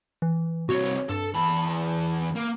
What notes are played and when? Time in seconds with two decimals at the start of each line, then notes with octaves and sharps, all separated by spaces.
0.22 E3
0.69 C2 F#4 C#5
1.09 G2 A4
1.35 E2 A5 B5
2.35 A#3